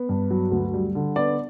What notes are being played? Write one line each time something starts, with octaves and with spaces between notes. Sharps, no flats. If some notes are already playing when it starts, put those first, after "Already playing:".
Already playing: B3
G2
F#3
D2
G3
D3
B3 D5